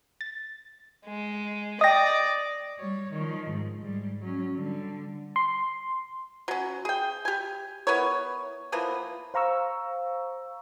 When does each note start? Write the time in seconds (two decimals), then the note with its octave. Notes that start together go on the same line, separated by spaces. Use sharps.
0.21 A6
1.06 G#3
1.81 D5 D#5 G5 D#6 A#6
2.79 G3 C#5
3.13 D#3 F3
3.50 G#2
3.81 G#2 G3
4.21 F#3 C#4
4.55 D3 G3
5.36 C6
6.48 F#3 C#4
6.85 G#4 G5
7.25 G4 G#5
7.87 B3 E4 A#4 C#5
8.72 E3 F3 A#3 B3
9.34 C5 F5 A#5 C#6 E6